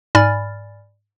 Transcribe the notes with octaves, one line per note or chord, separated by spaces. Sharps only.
G#2 D5 G#5 B5 F6 A6